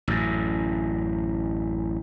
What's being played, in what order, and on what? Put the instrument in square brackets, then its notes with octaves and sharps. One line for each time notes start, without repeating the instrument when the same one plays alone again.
[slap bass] A1 F#2